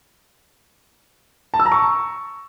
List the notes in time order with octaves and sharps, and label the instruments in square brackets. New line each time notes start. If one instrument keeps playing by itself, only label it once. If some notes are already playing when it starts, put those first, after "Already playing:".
[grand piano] A5
E6
A#5
C#6